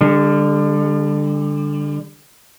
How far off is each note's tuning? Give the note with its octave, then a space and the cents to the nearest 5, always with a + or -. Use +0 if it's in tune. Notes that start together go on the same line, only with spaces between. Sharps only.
D3 +0 G3 +35